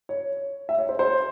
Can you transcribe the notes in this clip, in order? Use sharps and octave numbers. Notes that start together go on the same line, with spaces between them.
C#5
E5
C#5
C5
C5